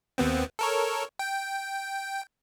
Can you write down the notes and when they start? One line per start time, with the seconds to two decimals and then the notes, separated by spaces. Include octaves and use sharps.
0.18 D#2 B3 C4
0.59 A4 A#4 C#5
1.19 G5